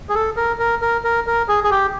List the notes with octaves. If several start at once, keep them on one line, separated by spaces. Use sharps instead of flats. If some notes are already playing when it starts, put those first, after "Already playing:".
G#4
A4
A#4
A#4
A#4
A#4
A#4
G#4
G#4
G4